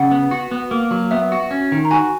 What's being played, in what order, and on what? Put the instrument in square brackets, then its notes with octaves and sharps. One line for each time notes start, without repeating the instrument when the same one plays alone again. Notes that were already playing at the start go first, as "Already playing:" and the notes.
Already playing: [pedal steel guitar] C#3 [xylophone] F#5
[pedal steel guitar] B3
F#4
B3
A#3
F#3
[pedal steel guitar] B3 [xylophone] E5
[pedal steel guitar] F#4
C#4
D#3
[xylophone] A#5
[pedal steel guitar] F#4 [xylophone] G#5